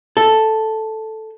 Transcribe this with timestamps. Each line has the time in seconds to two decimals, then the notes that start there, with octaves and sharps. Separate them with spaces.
0.17 A4